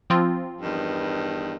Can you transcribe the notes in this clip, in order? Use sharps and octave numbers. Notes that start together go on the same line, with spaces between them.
F3 C4 F4
E2 G2 D#3